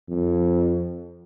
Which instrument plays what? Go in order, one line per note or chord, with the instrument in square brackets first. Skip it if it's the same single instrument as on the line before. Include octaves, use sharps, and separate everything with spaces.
[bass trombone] F2